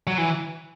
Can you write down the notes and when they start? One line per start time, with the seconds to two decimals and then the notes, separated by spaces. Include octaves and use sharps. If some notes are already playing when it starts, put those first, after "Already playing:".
0.07 F#3
0.18 E3